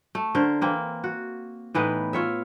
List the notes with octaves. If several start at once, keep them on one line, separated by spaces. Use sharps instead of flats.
A3
D3 A#4 C5
E3 A#3 C4
F#4
A2 E3 B3 D#4
F4 C#5 E5